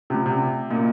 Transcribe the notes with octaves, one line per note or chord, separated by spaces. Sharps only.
C3 A3 C#4 F4
C3
A#2 A#3 C#4 F#4